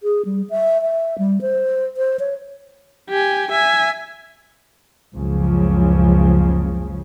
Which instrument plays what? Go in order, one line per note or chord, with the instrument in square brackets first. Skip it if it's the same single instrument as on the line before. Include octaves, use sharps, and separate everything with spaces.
[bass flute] G#4
G3
E5
E5
G3
C5
C5
C#5
[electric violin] G4 G#5
E5 G#5
[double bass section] F#1 C#2 C#3 F3